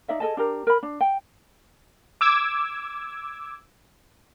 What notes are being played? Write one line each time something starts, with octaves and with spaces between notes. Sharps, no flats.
D#4 D5 E5 F5
G#4 A4 D#5 A5
D4 G4 A#4
A#4 B5
D4
G5
D6 E6 G#6